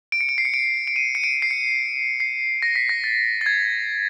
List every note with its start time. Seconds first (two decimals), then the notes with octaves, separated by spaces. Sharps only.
0.12 D7
0.21 C#7
0.29 D7
0.38 C7
0.45 C#7
0.54 D7
0.87 D7
0.96 D#7
1.15 C#7
1.24 D7
1.42 C7
1.51 C#7
2.20 C7
2.62 A#6
2.76 B6
2.89 A#6
3.04 A6
3.41 A6
3.46 G#6